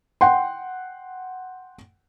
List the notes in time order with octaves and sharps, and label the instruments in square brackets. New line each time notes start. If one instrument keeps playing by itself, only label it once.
[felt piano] F#5 G5 C6